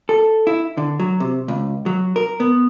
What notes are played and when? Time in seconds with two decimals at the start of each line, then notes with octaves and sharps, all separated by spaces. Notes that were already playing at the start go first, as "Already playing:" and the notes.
0.09 A4
0.47 E4
0.77 D3
0.99 F#3
1.20 C3
1.48 C#2
1.86 F#3
2.16 A#4
2.40 B3